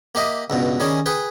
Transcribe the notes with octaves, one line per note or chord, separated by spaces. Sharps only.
A#3 G4 D#5 E5
C#2 G2 B2
D#3 G3 C#4 G#4
G#4 B4 G5